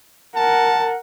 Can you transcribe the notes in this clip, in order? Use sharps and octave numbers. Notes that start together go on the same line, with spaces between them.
A#4 F#5 A5